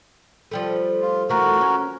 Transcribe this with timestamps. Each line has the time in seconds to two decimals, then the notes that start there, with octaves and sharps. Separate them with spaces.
0.51 F3 G3 A3
1.02 F4
1.29 E3 A3 F#4 A#4
1.61 C#4